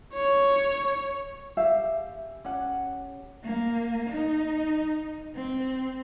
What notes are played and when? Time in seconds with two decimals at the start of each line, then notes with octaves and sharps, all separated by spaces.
0.14 C#5
1.57 G4 G#4 E5 F5
2.45 C#4 G4 F#5
3.44 A#3
4.10 D#4
5.35 C4